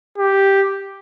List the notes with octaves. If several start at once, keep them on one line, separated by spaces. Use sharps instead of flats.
G4